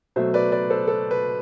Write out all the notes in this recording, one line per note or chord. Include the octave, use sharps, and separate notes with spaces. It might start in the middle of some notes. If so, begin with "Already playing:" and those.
B2 F#3 A3 C5 E5
B4 D5
B4 D5
A4 C5
A4
B4